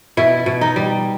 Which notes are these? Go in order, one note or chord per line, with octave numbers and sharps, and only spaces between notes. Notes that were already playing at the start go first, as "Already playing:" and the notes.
B2 E4
B2
D#4
G3